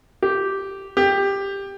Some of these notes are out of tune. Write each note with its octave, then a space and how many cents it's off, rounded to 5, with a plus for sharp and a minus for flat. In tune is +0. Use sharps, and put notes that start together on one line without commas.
G4 -10
G4 +10